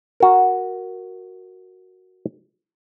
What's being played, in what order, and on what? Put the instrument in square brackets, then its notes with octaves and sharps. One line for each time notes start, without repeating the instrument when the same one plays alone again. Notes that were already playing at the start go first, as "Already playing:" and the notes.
[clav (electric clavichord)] F#4 A#4